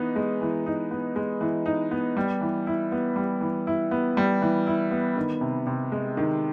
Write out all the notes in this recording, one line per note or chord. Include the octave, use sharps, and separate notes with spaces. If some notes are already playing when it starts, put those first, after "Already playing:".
Already playing: E3 B3 D#4
G#3
E3
D#4
B3
G#3
E3
D#4
B3
G3
E3
E4
B3
G3
E3
E4
B3
G3
E3
E4
B3
D#3
C3
C3
G#3
D#3